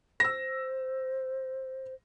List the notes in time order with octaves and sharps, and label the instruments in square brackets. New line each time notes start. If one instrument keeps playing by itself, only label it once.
[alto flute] C5 [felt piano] E6 A#6